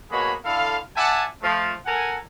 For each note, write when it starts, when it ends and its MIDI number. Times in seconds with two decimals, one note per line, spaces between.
0.11 0.34 47
0.11 0.34 58
0.11 0.34 68
0.11 0.34 73
0.11 0.34 78
0.11 0.34 83
0.45 0.78 50
0.45 0.78 64
0.45 0.78 69
0.45 0.78 77
0.97 1.25 74
0.97 1.25 76
0.97 1.25 78
0.97 1.25 80
0.97 1.25 81
1.42 1.73 53
1.42 1.73 57
1.86 2.18 69
1.86 2.18 70
1.86 2.18 78
1.86 2.18 80